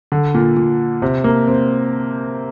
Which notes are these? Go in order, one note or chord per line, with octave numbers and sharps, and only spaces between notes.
D3
A#2
A#2
C3
A#3
C4